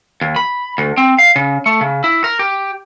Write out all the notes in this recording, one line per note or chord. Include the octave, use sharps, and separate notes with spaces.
D#2
B5
D2
C4
F5
C#3
A3
C#3
E4
A#4
G4